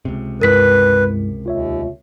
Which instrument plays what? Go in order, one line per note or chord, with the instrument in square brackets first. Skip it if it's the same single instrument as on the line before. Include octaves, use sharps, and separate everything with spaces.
[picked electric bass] C#2 C3
[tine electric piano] G2 G#3 E4 [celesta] A#4 B6 [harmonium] B4
[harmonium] D#2 [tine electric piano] F4 C#5 E5